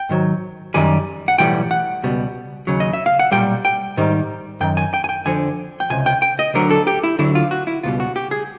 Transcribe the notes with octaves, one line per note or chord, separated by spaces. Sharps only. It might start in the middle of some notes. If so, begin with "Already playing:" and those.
Already playing: G5
G#2 D#3 F#3
F#2 D#3 G3 G#5
F#5
B1 A2 E3 G3 G5
F#5
C#2 B2 G3
D#2 C#3 F#3
D#5
E5
F5
F#5
B1 A#2 G3 G5
G5
G#2 D#3 G3
F#2 D#3 G5
G#5
G5
G#5
G5
F2 D3 F3 G#5
G5
C#2 C3 G#5
G5
G5
D#5
D2 D3 F#3 A#4
A4
G4
E4
D2 D3 F#3 E4
F4
F#4
E4
C#2 B2 G3 F4
F#4
G4
G#4